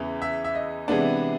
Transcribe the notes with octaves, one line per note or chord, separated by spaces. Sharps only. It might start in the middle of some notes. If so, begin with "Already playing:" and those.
Already playing: E2 C#3 E3
E5
E5
D#5
C3 E3 G#3 B3 D4